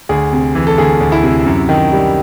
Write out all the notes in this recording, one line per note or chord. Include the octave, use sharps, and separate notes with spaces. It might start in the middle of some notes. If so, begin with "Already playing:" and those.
D2 G#4
C3
E3
A4
D2 G#4
D2
E4
C3
F#2
D#3
G3